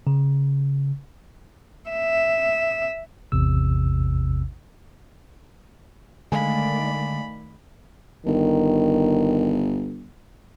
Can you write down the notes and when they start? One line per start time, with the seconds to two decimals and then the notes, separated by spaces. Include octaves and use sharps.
0.07 C#3
1.90 E5
3.32 A1 E2 C3 E6
6.32 D3 D#3 G#3 A3 D5 F5 G#5 B5
8.26 G1 D#3